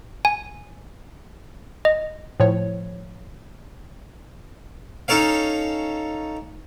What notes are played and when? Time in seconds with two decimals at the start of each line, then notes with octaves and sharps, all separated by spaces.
0.25 G#5
1.85 D#5
2.40 A2 F3 C#5
5.08 C#4 D#4 A4 C#5 F5